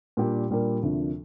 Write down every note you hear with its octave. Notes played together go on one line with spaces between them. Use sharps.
A#2 G3 D4 G4 A#4
A#2 G3 D4 G4 A#4
D2 C3 F3 A#3 D4